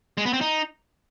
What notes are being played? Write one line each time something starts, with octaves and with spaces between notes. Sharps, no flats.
G#3
B3
C4
D#4